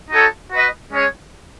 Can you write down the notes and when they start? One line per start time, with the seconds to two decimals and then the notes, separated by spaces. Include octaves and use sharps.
0.11 D#4 F#4 A4 C#5
0.51 F#4 B4 D#5
0.92 G#3 C#4 G#4 C#5